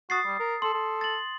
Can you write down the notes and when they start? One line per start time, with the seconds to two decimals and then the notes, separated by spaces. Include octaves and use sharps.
0.10 F#4 D#6 A6 C7
0.25 G3
0.39 A#4
0.62 A4 C6
0.74 A4
1.01 A6 F#7